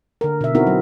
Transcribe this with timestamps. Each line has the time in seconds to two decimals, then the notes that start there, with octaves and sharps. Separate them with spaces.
0.21 D3 A#4
0.41 B2 E5
0.55 B3 C4 D#4 E4 F#4 A#4
0.67 F#3